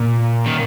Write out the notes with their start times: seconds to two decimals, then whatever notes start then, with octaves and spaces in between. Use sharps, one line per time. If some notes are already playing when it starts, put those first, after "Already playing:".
Already playing: A#2
0.46 D#3